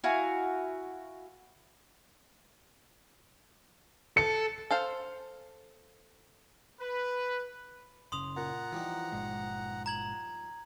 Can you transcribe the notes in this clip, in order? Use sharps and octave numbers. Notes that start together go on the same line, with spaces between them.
E4 F#4 F5 G#5
A4 C#7
A4 C5 F5
B4
F#1 C#3 C6 D#6 F7
A#2 F#5 A#5
E3 F3 G3 D#4
G1 A#2 G#3
A#5 G#6 F#7